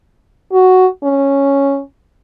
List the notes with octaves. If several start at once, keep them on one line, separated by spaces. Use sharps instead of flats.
F#4
C#4